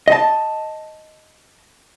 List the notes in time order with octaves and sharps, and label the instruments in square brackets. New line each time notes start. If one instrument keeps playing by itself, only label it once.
[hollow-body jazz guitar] D#5 A5